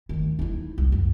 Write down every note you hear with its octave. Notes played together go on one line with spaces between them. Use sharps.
D2 D#3
D#4 E4
C2
F#2